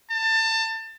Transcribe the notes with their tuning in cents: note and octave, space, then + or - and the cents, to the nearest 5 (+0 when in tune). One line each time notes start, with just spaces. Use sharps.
A5 +25